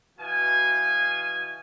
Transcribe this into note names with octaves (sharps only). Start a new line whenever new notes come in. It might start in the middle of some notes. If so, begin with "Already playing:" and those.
B2 E3 F#4 F5 G#5